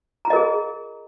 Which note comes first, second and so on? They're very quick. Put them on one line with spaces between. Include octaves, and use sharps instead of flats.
A#5 F4 D#5 A#4 G#4